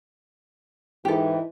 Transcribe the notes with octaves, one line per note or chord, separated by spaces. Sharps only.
G#2 E3 G4 A4